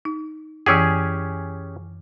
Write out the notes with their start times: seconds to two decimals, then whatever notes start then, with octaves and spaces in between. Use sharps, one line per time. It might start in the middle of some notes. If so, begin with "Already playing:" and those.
0.05 D#4
0.66 F#2 E3 C#4 G4 G#4